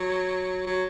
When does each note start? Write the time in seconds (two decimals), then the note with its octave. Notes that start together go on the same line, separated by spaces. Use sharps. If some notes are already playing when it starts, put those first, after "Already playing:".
Already playing: F#3
0.66 F#3